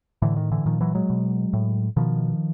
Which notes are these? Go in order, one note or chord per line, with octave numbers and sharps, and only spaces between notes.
A2 D3 E3
D#3
D3 E3
A#2 D#3 F3
E3 F#3
F#3 G#3
B2
A2
B2 D#3 F3